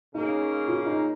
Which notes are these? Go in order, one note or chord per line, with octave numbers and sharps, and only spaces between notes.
C#3 A#3 C#4 D#4
F4
D#4